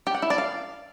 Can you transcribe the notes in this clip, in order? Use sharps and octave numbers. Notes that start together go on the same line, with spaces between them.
G4
F#5
E4
D5
F5